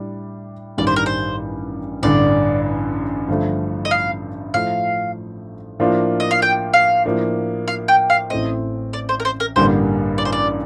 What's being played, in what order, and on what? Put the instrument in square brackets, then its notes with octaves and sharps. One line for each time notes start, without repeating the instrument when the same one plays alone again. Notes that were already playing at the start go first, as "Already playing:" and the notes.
Already playing: [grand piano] A2 G3 D4
[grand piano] A1 G2 D#3 G3 [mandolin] D5
[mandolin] C5
A#4
C5
[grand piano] A1 G2 D3 [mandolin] D5
[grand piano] G2 D3 F3 A3
[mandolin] D#5
F5
[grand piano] A2 F3 A3 [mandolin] F5
[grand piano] A2 F3 A#3 D4 F4
[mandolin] D#5
F5
G5
F5
[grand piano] A2 F3 A#3 D4
[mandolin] F5
G5
F5
[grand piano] A1 A2 A3 C4 [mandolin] D#5
[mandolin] D5
C5
A#4
C5
A#4
[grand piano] A1 G2 D3 G3 A#3 [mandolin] C5
[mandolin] D5
C5
D5